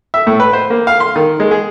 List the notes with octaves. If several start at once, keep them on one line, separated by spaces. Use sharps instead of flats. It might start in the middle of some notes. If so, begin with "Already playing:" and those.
E5
A2
B4
C5
A#3
F5
C6
D#3
G#3
G#4